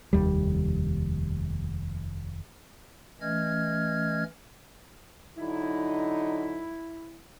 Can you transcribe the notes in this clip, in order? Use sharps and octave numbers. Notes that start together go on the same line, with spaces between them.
F1 D#2 G3
E3 A3 C#4 D#5 F6 G#6
D3 F#3 D#4 E4